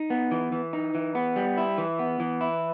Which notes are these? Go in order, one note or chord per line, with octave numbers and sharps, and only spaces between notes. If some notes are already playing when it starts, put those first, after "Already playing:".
Already playing: D#4
B3
E3
E3
D#4
E3
B3
G3
E4
E3
B3
E3
E4